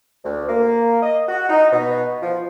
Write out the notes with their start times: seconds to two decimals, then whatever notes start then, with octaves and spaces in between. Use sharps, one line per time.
0.24 D2
0.48 A#3
1.03 D#5
1.28 F#4
1.50 D#4
1.72 B2
2.23 F3